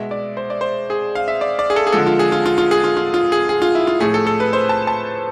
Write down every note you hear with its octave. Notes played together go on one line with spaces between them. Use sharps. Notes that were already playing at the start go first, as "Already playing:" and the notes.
Already playing: B2 G#3 E5
D5
C5
D5
C5
G#4
F5
E5
D5
D5
G#4
A4
G#4
D3 F3 G#3 A4
F4
G#4
F4
F4
F4
G#4
F4
F4
F4
G#4
G#4
F4
E4
F4
A2 F3 A3 G#4
A4
A4
B4
C5
A5
A5